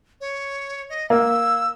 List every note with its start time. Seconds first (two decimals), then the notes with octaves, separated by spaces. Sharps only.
0.21 C#5
0.90 D#5
1.10 A#3 E6